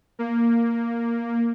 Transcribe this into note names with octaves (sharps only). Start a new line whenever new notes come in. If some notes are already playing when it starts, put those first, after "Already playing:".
A#3